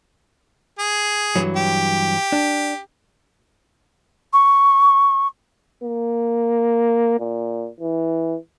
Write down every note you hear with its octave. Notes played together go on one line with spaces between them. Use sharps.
G#4
G2 E3 F#3
G4
D4
C#6
A#3
A#2
E3